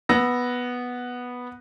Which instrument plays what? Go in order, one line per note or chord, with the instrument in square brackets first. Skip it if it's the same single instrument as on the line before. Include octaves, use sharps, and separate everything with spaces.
[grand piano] B3 E6 A#6